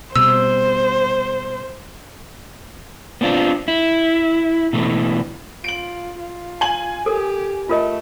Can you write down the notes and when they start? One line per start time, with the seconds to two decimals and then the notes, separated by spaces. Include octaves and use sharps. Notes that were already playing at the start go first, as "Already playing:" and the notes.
0.16 B2 G3 C4 C5 E6
3.21 B3 C4 D4 F4
3.68 E4
4.73 B2 E3 A3
5.64 F4 D7 F#7
6.20 F4
6.61 G#5 F#7
7.06 G4 A4 A#4
7.69 A3 F4 A#4 D#5